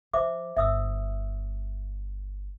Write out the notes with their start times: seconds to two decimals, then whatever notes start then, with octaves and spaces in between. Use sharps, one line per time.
0.13 F3 C5 E5 D6
0.57 G1 E5 D#6 E6